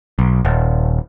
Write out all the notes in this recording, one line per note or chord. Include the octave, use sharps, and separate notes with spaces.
B1
D#1